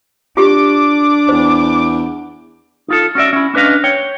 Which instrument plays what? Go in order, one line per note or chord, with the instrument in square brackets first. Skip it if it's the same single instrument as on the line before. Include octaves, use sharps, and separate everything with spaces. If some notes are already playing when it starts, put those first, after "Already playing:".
[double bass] D4 [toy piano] F4 G4 [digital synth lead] D6
[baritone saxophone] E2 [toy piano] C5
[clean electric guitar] D#4 F4 A4
C#4 F#4 D5 E5
C#4 E4
C#4 D4 B4 D#5 F5
C#5 G5